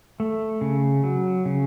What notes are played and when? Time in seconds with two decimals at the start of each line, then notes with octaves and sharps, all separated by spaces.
0.20 A3
0.61 C#3
1.04 F#3
1.45 C#3